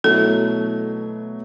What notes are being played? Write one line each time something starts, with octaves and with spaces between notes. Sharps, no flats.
B2 F#3 A3 E4 A4